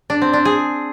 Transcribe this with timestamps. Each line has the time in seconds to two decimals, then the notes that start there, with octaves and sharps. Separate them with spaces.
0.10 D4
0.22 C4
0.33 D4
0.45 G#4